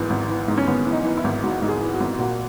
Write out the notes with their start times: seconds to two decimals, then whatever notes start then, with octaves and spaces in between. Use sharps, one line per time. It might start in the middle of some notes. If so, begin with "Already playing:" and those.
Already playing: G#1 G#2 E3
0.10 G#1
0.29 E3
0.48 G#2
0.58 C#4
0.67 G#1 B3
0.86 E3
0.92 D#4
1.05 E3
1.17 E4
1.24 G#1
1.43 G#2 F#4
1.62 G#2
1.69 G#4
1.81 E3
1.94 F#4
2.00 G#1
2.19 A#2 F#4